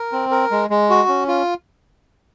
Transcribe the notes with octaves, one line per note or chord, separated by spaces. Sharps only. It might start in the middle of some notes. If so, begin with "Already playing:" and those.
Already playing: A#4
C4
A#4
G#3
G#3
F#4
C#4
F4